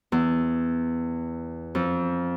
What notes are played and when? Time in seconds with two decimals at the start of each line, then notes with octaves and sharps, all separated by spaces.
0.12 E2
1.75 F2